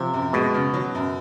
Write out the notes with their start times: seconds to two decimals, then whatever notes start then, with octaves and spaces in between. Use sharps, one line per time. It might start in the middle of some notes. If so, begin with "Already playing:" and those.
Already playing: C3 F3
0.14 F#2
0.33 B2 G#3
0.54 C#3
0.74 F#3
0.95 F#2